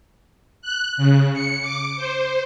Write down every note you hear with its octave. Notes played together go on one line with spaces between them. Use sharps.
F#6
C#3
C#7
D6
C5